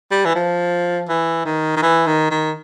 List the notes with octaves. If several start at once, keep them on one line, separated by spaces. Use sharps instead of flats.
G3
E3
F3
E3
D#3
D#3
E3
D#3
D#3